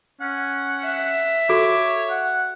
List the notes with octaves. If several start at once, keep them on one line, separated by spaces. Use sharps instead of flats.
C#4 F#5
E5
F#4 G#4 A4 C#5 D6
F#5